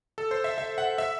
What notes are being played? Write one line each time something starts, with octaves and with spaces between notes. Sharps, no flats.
A4
C5
E5
E5
F#5
E5